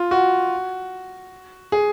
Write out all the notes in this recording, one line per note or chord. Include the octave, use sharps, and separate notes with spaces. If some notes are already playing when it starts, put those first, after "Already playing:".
Already playing: F4
F#4
G#4